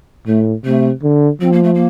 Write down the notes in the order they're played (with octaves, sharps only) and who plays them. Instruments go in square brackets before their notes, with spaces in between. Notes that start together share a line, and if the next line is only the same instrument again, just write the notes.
[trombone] A2 [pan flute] A3
[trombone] C3 [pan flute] A3
[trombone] D3
[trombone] F3 [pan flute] C4
[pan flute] A#3
A3
A#3